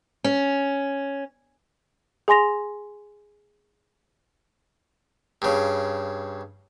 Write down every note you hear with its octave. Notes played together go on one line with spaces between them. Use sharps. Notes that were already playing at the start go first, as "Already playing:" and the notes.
C#4
G#4 G#5 C6 A#6 F7
G2 C#3